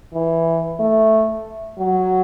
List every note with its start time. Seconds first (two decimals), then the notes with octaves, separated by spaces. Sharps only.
0.13 E3
0.80 A3
1.79 F#3